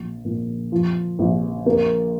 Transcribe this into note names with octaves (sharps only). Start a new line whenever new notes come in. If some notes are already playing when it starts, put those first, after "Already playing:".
Already playing: A#1
A#2
F3
A#1
A#3